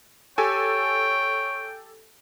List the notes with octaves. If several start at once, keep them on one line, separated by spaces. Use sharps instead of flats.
G4 A4 C#5 G5 G#5